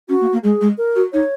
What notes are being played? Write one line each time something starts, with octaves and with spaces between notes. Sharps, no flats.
C#4 F#4
A#3
A#3
G#3 G#4
G#3
A#4
F#4
D#4 C#5